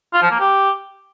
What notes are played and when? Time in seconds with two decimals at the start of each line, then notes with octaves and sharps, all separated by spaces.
0.13 F4
0.22 F3
0.31 A#3
0.40 G4